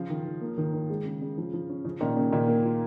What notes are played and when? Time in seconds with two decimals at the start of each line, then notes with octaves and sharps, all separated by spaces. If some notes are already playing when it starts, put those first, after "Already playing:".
Already playing: C#3 F3 F4
0.10 D#3
0.25 D#3
0.41 A#3
0.58 D#3
0.73 D#3
0.90 G#3
1.05 C#3
1.21 C#3
1.38 F3
1.54 F3
1.69 C#4
1.85 C#3 F3
2.01 A#2 D#3 C#4
2.16 C#3 A#3
2.32 A#2 D#3 F4
2.48 A#3
2.64 F4